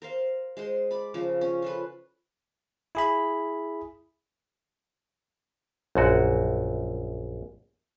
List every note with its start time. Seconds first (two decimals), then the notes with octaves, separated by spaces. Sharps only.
0.02 A#4 C5 F5
0.57 G#3 G#4 C5
0.91 D5 B5
1.14 C#3 F3 A#4
1.41 C#4
1.62 F4 A4 B4
2.95 E4 G#4 B5
5.95 A#1 F#2 F#4